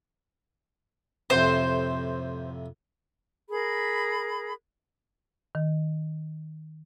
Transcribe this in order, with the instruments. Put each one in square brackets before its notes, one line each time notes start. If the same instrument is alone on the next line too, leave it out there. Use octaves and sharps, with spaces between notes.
[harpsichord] F2 A2 C3 [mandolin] C5
[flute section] G#4 A#4 B5
[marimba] D#3